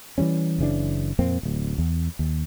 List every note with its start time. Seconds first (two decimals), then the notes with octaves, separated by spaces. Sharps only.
0.18 E3 F#3 G3 C#4
0.59 F#1 C#3 E3 D4
1.19 F2 A#2 A#3 C4
1.43 D1 D2
1.78 E2
2.19 D#2